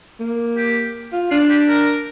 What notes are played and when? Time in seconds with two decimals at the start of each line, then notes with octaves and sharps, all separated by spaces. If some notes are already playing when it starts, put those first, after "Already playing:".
0.20 A#3
0.57 G4
1.13 F4
1.31 D4 F4
1.50 G4
1.68 A#4